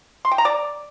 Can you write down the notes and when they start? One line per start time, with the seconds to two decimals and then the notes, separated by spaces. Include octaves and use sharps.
0.25 C6
0.31 G5
0.38 A#5
0.45 D5